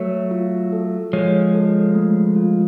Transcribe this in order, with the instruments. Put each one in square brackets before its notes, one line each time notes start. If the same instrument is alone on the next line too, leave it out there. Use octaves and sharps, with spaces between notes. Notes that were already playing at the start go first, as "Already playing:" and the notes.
Already playing: [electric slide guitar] F#3 A3 [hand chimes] C#5
[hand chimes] F4
A4
[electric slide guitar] F3 G#3 [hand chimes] C#5
[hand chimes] A4
A3
F4